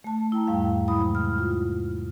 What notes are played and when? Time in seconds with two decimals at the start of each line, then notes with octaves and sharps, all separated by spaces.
0.04 A3 A5
0.32 E4 G5 A#5
0.47 E2 G#2 G3 F5
0.88 C3 F#3 G#3 E4 B5 D#6
1.15 F6
1.38 F4